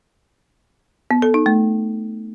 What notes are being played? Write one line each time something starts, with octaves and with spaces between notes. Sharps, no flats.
B3
A4
D#4
A3